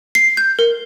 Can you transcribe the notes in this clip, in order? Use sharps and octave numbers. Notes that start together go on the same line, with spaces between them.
C7
G6
A#4